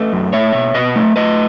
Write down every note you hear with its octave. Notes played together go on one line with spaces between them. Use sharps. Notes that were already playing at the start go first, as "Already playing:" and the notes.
Already playing: A3 B4 D#5
F#2
A3 C#5 E5
B2
B2 B4 D#5
A3
A3 B4 D#5